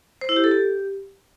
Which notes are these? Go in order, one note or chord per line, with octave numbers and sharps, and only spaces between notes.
C5
E4
G4
A4
G4